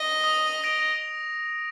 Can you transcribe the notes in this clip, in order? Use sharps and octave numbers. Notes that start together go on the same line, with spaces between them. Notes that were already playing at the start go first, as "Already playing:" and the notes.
Already playing: D#5
D#6
A#6 D7 F7